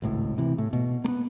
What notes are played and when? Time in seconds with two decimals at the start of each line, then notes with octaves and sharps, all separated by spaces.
0.02 G#1 C#2 A2
0.38 C3 E3
0.58 A2
0.73 B2
1.04 A#3 B3